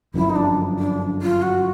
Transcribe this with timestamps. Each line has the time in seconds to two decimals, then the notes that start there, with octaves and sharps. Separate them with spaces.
0.14 G1 F#2 C#3 F3 E4
0.30 D#4
0.35 D4
0.79 D4
1.22 F4
1.42 F#4